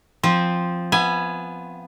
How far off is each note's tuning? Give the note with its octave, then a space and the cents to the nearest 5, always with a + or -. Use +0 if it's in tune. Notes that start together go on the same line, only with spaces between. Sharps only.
F3 +0 C4 +0
B3 +0 E5 +40 G#5 +0